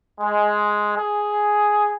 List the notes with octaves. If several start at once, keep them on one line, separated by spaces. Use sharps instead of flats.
G#3
G#4